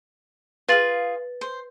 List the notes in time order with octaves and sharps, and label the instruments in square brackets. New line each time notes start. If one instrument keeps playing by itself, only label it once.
[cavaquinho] F4 G#4 F5 [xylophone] B4 A6 F#7
[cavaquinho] C5